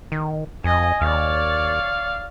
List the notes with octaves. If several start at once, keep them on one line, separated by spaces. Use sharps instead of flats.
D#3
F2 D#5 G#5
D#2 C#5 D5 F5